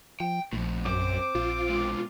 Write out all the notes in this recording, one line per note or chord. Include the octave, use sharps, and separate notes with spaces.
F3 G5
A#1 A2 F3
F#2 C4 C5 D6
A#1 F4
B2 G#3